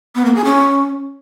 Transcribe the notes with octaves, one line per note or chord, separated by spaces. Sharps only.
B3
A#3
G#4
C#4